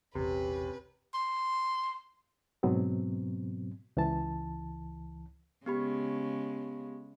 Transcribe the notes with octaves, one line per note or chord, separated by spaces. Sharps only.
E1 A#1 E2 C3 C4 C#4 G4 B4
C6
G#2 B2 F#3 B3 C4
C#2 E3 A5
C#3 G#3 B3 G4 B5